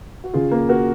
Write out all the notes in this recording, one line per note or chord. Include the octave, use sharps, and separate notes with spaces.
F#4
C#3 F4 G#4
A#3
A#3 F#4 A#4